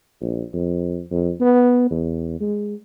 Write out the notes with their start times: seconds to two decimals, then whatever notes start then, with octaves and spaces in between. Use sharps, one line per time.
0.21 A#1
0.54 F2
1.11 F2
1.41 B3
1.91 E2
2.41 G#3